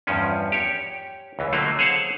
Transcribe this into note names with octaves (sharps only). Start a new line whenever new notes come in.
E2 G2 F3 C#4
G4 C#5
C#2 E3
D3 F#3 A3 A#3
G#4 C5 C#5 F5 F#5 A5